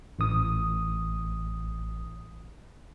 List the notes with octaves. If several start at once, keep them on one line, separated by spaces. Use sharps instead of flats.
A1 D#6